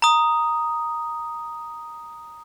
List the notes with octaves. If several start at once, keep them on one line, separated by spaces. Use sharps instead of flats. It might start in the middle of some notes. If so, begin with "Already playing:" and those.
A#5 D#6